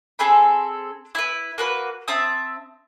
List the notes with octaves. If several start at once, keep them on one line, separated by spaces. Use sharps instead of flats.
C4 G#4 A4 B5
E4 B4
A#3 F#4 B4
C4 E5 A5 D#6